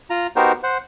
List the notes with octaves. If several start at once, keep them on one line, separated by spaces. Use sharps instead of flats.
F4 A#5
B3 D#4 F#4 G4 A#4 C5
C5 F#5